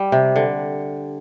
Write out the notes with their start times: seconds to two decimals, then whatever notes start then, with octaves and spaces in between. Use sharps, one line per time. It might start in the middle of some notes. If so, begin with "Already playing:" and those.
Already playing: G3
0.12 C3
0.36 D3